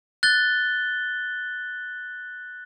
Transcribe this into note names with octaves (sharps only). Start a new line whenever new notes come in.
F#6 A6 G7